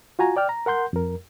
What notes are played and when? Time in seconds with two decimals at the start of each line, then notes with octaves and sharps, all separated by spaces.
0.19 F4 F#4 G#5 A#5
0.36 D5 G5 F6
0.49 A#5
0.66 A#4 F#5 C6 G6
0.93 F2 A#4